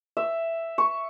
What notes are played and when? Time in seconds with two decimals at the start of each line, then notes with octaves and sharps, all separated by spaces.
0.17 E5
0.78 C#6